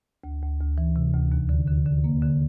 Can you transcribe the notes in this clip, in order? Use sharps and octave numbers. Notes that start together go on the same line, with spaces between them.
D2
D2
D2
E3
C3
D2
D#2
D3
D3
D3
A#3
D3